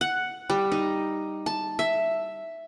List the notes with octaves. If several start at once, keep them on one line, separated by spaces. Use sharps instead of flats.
F#5
G3
D#4
A5
E5